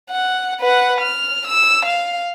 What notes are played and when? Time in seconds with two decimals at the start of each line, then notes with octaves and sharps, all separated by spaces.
0.10 F#5
0.61 B4 F#5
1.01 F6
1.48 E6
1.86 F5